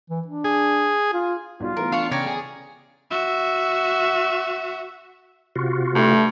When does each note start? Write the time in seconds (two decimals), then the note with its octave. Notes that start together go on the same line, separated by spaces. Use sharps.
0.10 E3
0.28 D4
0.44 G#4
1.13 F4
1.60 B1 G3 F4 F#4
1.77 E3 A3 B3 A#4
1.92 D4 F5 C#6
2.11 C#3 C#5 D5 G5 A#5
2.26 G#4
3.11 F#4 E5
5.56 C3 F4 F#4
5.95 G2 A3